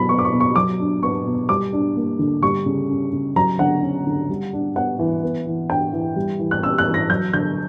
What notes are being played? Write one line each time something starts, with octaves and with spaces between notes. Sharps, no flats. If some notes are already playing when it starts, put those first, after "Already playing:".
Already playing: B2 F#3 A#5 B5
B3 C#6
D6
C#6
B2
C#6
F#3 D6
D4
B3 C#6
B2
G3 D6
D4
A#3
D3
G3 C#6
C#3
C#4
C#3
F#3 A#5
D3 F#5
C#4
D3
G3
D4
B3 F#5
E3
B3
E3
D4 G5
E3
G3
E3
F#6
C#4 E6
F#6
E3
A#6
F#3 G6
D3 G6